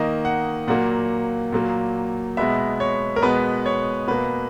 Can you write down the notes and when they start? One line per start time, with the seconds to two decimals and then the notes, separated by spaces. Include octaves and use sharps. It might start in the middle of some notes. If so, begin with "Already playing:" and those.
Already playing: D#3 A#3 D#5
0.25 F#5
0.67 A#2 F#3 A#3 F#5
1.52 A#2 F#3 A#3
2.37 B2 G#3 B3 E5
2.80 C#5
3.16 A#4
3.22 B2 G#3 B3 B4
3.66 C#5
4.07 B2 A#3 B4